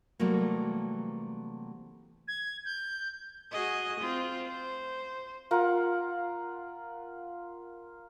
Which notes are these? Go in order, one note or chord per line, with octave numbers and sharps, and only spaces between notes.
C3 E3 F#3 G3 A3 A#3
G#6
G6
F#4 G#4 D#5
C4 F4
C5
F4 A#4 F#5